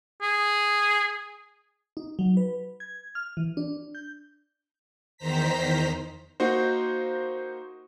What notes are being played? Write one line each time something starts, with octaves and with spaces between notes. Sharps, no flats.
G#4
D#4
F#3
B4
G#6
F6
E3
D4
G6
E2 D#3 C5 A#5 B6
A#3 D#4 F#4 C5